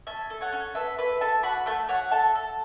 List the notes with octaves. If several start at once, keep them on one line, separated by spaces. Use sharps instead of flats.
C#4 E5 A5
A4
C#5 F#5
C#4
A4 B4 E5
A4 B4 E5
A4 E5 A5
F#4 F#5 B5
A3 E5 A5
F#4 C#5 F#5
A4 E5 A5
A4